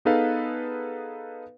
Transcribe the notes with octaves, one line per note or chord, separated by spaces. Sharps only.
B3 D#4 G#4 A4 B4 F5